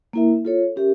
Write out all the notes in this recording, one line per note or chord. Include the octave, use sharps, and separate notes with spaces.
A#3 E4 A#4 E5
F4 A4 C#5
C#4 G4 A#4 E5